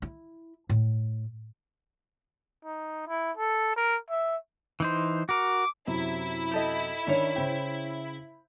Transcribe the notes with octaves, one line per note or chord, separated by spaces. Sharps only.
E4
A2
D#4
E4
A4
A#4
E5
E3 D#4 C5
F#4 A#4 D6
F#2 C3 E4
G4 A4 D#5
D#3 C#4 D4 C#5
C#3 C5 G5